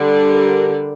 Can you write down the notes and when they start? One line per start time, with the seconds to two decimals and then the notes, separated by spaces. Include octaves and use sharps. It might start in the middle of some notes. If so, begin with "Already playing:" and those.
Already playing: D3 G3 D4
0.32 A#4